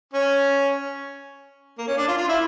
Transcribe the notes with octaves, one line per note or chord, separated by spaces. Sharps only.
C#4
A#3
C#4
D4
F4
F4
E4